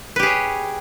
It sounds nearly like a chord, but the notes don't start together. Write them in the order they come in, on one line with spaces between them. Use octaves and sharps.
B4 G4 G#4 C#5